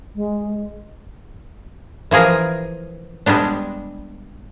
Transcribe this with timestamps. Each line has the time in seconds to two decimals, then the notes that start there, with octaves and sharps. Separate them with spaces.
0.16 G#3
2.11 E3 F3 G#4 A#4
3.26 G3 G#3 B3 D4